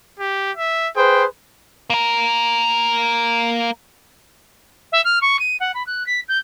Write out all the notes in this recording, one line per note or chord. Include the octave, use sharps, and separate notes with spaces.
G4
E5
G#4 B4 C5 G5
A#3 A#4
E5
F6
C#6
D#7
F#5
B5
F#6
B6
G6